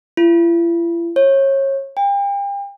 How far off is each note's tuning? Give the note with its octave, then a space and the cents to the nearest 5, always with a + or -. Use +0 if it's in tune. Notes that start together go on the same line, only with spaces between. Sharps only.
E4 +45
C#5 -30
G5 +40